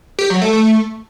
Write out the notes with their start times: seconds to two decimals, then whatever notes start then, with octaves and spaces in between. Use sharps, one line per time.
0.19 G4
0.30 F#3
0.42 A3
0.53 A3